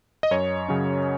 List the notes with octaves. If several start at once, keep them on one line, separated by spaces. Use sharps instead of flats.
D#5
F#2 C#5
C#3 F#3 C#4